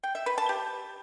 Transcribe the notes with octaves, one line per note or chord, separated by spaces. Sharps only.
G5
E5
B4
A5
G4